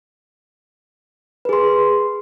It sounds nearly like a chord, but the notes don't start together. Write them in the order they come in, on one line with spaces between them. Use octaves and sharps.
B4 G#4 C6